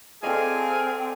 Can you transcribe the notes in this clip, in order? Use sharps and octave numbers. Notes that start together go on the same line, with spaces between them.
C4 G#4 A4 D5 D#5 F5 G#5